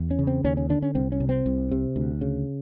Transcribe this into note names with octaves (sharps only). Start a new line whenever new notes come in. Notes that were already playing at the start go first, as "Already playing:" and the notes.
Already playing: E2
C#4
C#3
C4
D#2 C#4
C#4
D3 D4
C#4
C2 C4
C#4
C3
C4
C2
C3
D2
C#3